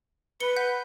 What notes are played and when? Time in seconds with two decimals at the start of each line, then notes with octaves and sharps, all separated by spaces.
0.40 B4 C#7 G7
0.56 F#5 G6 B6